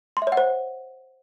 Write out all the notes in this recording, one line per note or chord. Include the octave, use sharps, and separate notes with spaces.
C6
E5
C#5
F#5
C5